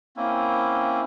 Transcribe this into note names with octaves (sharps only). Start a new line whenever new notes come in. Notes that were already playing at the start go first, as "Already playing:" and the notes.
A#3 C4 C#4 E4